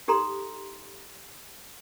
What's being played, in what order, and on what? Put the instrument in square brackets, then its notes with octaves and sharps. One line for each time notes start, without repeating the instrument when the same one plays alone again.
[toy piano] D#4 G4 A4 A#5 C6